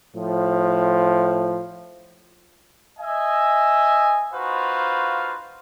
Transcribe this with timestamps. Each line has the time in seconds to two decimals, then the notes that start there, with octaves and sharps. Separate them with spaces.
0.16 A2 F3
2.99 D#5 E5 G#5
4.34 D#4 F4 F#4 B4 C5 F5